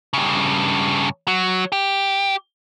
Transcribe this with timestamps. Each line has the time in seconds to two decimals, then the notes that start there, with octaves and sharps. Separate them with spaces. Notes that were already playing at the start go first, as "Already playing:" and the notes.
0.13 G2 C#3
1.28 F#3
1.72 G4